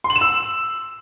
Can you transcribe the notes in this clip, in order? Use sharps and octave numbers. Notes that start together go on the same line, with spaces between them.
C6
F#7
E7
E6